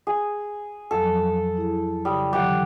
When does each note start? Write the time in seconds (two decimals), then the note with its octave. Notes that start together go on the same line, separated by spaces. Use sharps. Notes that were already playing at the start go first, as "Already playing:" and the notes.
0.07 G#4
0.91 F2 F3 F#3 A4
1.57 E4 G#4
2.05 C#3 G3 D#6
2.33 D3 E3 F#3 G4 F#5